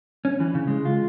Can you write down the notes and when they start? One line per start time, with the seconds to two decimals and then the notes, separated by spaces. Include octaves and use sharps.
0.25 C#4
0.40 E3
0.55 C#3
0.67 G#3
0.85 F4